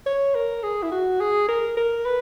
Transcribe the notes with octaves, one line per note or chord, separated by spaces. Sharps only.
C#5
A#4
G#4
E4
F#4
G#4
A#4
A#4
B4